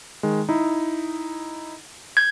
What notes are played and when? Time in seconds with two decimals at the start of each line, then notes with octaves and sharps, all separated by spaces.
0.23 D#3 G#3
0.49 D#4 E4
2.17 G6 G#6